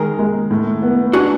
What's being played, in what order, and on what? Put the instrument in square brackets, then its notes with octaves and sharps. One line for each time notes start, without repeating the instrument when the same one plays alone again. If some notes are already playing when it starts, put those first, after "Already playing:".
Already playing: [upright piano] D#3 G#3 [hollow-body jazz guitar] G#4 A#4
[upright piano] G#3
A2
B3
[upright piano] D4 [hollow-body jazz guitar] F#4 G#4